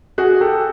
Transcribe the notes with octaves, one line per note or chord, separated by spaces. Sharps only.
F#4 G#4
G4 A4